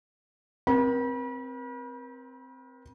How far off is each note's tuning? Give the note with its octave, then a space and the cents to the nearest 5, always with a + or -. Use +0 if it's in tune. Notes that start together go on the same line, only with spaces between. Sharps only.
C4 +0 A#4 +40 B5 -40